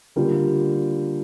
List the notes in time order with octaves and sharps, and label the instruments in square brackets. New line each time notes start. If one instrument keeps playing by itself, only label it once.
[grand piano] D3 G3 A#3 F4